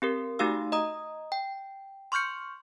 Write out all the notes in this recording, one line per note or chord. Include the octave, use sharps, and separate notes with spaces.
C4 G4 A#4
A3 D#4 F#4 G4 F5 E6
D#5 A#5 D#6
G5
C6 C#6 F6 G6 C#7